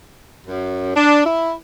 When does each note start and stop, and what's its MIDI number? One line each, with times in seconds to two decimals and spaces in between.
0.47 0.93 42
0.96 1.20 62
1.25 1.53 64